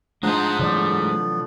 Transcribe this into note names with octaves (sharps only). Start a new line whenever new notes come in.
F3 G#3 D4 D#4 C5 F#5 A#5 D#6
A2 C3 E3 F#3 B3 D4 D5